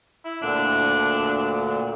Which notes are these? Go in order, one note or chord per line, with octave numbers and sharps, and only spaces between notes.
E4
D2 A#2 D3 D4